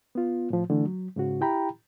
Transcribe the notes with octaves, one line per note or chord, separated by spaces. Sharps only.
B3 F4
A2 F3
D3 E3 A3 D4
F#3
G#2 C#3 F#4
E4 G4 G5 A#5 B5